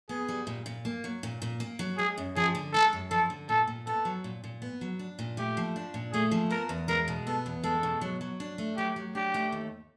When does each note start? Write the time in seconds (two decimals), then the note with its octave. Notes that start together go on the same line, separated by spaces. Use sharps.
0.09 B3 G#4
0.29 G3
0.47 A#2
0.66 A#2
0.85 A#3
1.04 F#3
1.23 A#2
1.42 A#2
1.60 A#3
1.79 F#3
1.98 G#3 G#4
2.18 F#2
2.36 F3 G#4
2.55 D3
2.73 G#3 A4
2.93 F#2
3.11 F3 A4
3.30 D3
3.49 A#2 A4
3.67 A#2
3.87 B3 A4
4.05 F#3
4.24 A#2
4.44 A#2
4.62 B3
4.81 F#3
4.99 D4
5.19 A#2
5.37 A3 G4
5.57 F3
5.76 D4
5.94 A#2
6.13 A3 G#4
6.31 F3
6.51 B3 A#4
6.69 E2
6.88 G#3 A#4
7.08 B2
7.26 B3 A4
7.46 E2
7.64 G#3 A4
7.83 B2
8.01 F#3
8.21 F#3
8.40 D4
8.58 A3
8.77 F#3 G4
8.96 F#3
9.15 D4 G4
9.34 A3
9.52 D#2